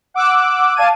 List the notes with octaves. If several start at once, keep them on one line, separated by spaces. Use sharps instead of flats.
F#5 D6 E6 F#6
D5 F5 A5 G#6 D#7